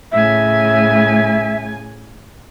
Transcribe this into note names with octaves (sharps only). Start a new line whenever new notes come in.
A2 C#3 E5 G#5